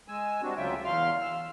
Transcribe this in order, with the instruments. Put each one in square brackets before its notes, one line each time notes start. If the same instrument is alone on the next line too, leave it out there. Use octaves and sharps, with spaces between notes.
[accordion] G#3 G#5 E6
G3 G#3 C4 D4 F#4
D2 C#3 F#3 F4 E5 G5
E2 F5 C6 F6
E6